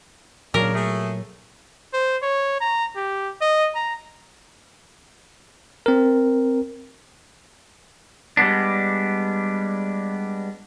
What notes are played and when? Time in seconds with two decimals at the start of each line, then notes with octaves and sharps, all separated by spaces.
0.54 A#2 C#3 F#3 D4 A#4
0.74 A3 G#4
1.94 C5
2.23 C#5
2.61 A#5
2.96 G4
3.41 D#5
3.75 A#5
5.86 C4 A#4
8.37 G3 G#3 B3 D4